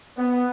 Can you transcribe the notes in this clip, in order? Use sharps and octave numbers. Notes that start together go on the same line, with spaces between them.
B3